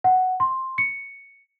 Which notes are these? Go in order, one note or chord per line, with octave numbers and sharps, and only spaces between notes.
F#5
C6
C#7